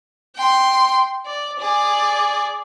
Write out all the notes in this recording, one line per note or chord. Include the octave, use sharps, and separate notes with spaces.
G5 C6
D5
G#4 D5